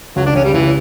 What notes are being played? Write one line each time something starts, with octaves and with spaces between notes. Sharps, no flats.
C#2 F#3
D4
C#2 C#4
G3
C#2 E3